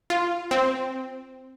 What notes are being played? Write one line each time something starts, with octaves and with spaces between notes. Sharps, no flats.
F4
C4